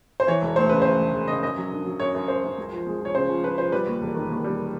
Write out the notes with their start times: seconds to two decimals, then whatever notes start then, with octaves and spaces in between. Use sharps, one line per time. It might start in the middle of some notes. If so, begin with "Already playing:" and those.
0.20 C5
0.27 E3 C#5
0.42 E1
0.56 D2 C5
0.69 C#3 B4
0.82 D2 C5
0.99 E1
1.13 E1
1.28 C#3 D#5
1.43 F#2 D#5
1.57 F#3
1.71 D3
1.86 F#3
2.00 F#2 C#5
2.14 F#2
2.28 F#2 C5
2.44 F#2
2.57 C#2
2.72 F3
2.86 G#3
3.00 F3 C#5
3.15 C#3 C5
3.29 F3
3.44 F3 B4
3.58 F3 C5
3.72 G3 B4
3.87 D#2
4.02 E1
4.15 D#3
4.30 D#2
4.44 G3